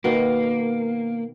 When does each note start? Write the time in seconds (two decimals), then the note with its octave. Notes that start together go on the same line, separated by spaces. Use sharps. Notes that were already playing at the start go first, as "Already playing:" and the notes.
0.04 B2 D#3 A#3 F#5